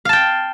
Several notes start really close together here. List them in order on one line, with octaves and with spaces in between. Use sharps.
F5 A5 G5